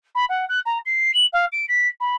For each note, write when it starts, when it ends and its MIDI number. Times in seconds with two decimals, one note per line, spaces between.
0.15 0.25 83
0.29 0.45 78
0.49 0.60 90
0.66 0.78 82
0.86 1.11 96
1.14 1.26 102
1.33 1.46 77
1.52 1.66 98
1.68 1.88 95
2.00 2.16 83